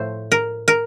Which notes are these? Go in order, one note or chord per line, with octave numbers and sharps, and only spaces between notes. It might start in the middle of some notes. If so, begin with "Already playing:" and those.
Already playing: A2 F3 A3 C5
A#4
A#4